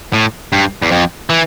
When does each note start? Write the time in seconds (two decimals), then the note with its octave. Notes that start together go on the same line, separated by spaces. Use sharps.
0.13 A2
0.52 G2
0.82 E2
0.91 F2
1.30 E3